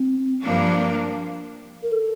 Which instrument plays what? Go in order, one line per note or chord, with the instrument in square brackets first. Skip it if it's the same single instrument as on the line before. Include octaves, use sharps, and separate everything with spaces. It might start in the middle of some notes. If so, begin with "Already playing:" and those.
Already playing: [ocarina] C4
[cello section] G2 F3 A#3 D4
[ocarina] A#4
A4